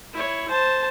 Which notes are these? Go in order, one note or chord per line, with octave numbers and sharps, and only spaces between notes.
E4 C#5
C5 A5